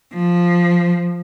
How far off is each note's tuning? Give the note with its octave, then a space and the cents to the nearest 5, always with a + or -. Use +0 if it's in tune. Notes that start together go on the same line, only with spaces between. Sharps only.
F3 +0